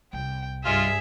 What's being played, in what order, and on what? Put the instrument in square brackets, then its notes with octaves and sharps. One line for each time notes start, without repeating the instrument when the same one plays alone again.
[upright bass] C2 [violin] G5
[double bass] G2 [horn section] G#3 F4 [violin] G#4 E5